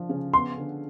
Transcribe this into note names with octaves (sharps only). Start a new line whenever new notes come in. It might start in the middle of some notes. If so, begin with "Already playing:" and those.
Already playing: F3 D4
C#3
B3 C6
D3